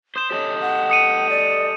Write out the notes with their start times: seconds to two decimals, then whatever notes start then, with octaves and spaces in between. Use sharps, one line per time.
0.16 C5 D#6 G6 E7
0.31 G4 A4 C#5 D#5
0.60 F#5
0.90 D#6 C#7 D#7
1.30 D5